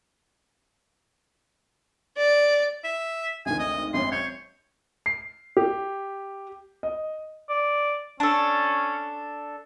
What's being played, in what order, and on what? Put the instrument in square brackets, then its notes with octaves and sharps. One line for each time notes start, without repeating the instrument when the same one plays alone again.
[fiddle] D5
[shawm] E5
[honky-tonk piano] G#1 D2 D#3 [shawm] G#5
[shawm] D#5
[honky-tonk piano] G#1 F#2 C#4 [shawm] C6
[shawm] C#5 [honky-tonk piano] G6
[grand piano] C7
G4
D#5
[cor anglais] D5
[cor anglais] C#4 [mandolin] D4 A4